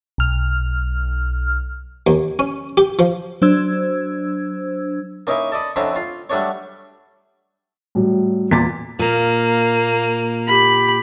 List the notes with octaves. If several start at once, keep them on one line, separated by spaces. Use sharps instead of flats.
B1 F6
D#2
C#4
G4
F3
F#3 D4 C5 E6 G#6
A#3 C#4 D#4 E4 A#4 G#5
A4 D5 D#5 B5
F2 D3 C4 C#4 E4 A#5
F4 F5
F#3 G3 A3 D4 C#5
A2 F#3 G3
E2 A#2 D6 A6 B6
A#2 A#3
G4 B5